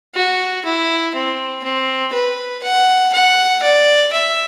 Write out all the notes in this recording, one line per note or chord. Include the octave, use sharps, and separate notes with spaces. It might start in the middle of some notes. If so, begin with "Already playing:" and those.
F#4
E4
C4
C4
B4
F#5
F#5
D5
E5